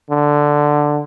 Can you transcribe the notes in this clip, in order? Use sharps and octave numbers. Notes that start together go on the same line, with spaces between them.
D3